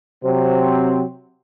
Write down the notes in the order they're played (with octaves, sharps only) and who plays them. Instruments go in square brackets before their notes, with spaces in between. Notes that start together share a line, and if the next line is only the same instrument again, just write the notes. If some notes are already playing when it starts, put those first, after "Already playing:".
[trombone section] C3 F#3 C4